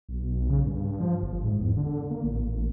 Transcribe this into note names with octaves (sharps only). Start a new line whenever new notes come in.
B1
C#3
G2
F3
G1
G#2
E2
D3
A#3
A1
A1